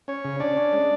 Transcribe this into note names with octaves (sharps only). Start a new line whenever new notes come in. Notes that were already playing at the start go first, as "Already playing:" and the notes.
C#4 C#5
C#3
C#4 D4 D5
C#4
G#3